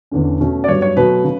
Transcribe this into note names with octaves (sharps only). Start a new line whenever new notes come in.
E2 D3 A3 C#4
B2 A3 C#4
D5
G2 F#3 B3 C#5
C#5
B2 F#3 A3 B4
C#3